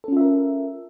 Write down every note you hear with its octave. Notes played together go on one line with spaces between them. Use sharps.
C#4 F4 A4 A#4 E5